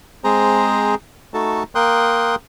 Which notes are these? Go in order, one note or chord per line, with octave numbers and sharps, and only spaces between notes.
G#3 C4 G#4 C5 A#5
A3 D#4 F#4 A4 A5
A#3 A#4 G5 C6 D#6 F#6